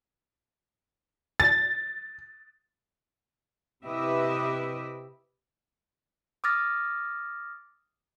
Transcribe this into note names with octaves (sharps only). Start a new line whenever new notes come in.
A6
C3 E4 G4 B4 D#5 E5
D6 D#6 F6 A6 A#6